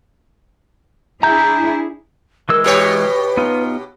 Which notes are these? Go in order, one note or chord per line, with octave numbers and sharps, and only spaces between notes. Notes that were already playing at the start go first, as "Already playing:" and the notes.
D4 E4 G#4 A#5 G6
E3 G#3 A#4 E6
B2 G4 B4 C#5
B3 D#4 F4